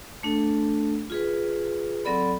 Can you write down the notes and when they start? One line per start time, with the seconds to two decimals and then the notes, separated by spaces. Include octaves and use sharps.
0.23 A3 D4 A4
1.10 F4 G#4 B4
2.05 F#3 C4 A4 D5 B5